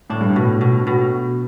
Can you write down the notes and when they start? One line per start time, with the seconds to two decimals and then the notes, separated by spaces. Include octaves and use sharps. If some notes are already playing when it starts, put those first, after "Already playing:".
0.10 A2 D4
0.21 G2
0.30 A2
0.36 B2
0.61 B2
0.87 B2